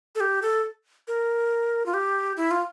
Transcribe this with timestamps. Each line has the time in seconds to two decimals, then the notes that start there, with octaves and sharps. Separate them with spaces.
0.15 A4
0.20 G4
0.42 A4
1.08 A#4
1.86 F4
1.94 G4
2.37 E4
2.51 F4